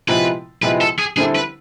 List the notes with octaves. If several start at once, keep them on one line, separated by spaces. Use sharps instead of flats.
C3 F3 G#3 B3 E4 B4
C3 F3 G#3 B3 E4 B4
A4
G#4
D3 G3 C4 E4 G#4 A4
B4